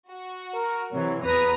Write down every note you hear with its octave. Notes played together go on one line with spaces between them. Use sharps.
F#4
A#4
C3 E3 F#3
E2 B4 A#5 D#6